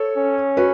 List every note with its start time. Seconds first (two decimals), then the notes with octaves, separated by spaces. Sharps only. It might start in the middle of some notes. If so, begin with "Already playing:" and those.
Already playing: A4 C#5
0.17 C#4
0.57 F#4 B4